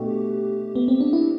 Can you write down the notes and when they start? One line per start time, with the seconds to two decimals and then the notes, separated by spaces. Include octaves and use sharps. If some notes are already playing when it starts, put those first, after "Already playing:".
Already playing: B2 A3 D4 F#4 G4
0.75 B3
0.88 C4
1.00 D4
1.13 E4